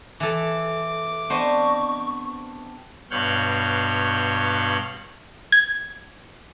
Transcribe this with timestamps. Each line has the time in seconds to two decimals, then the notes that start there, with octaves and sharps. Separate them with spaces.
0.20 E3 A4 D6
1.30 B3 C4 D4 C5 D#5 C#6
3.11 G2 B2 C#5 F5 F#6 G6
5.52 G#6